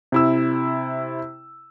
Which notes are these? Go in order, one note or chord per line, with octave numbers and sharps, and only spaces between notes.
C3 E4 E6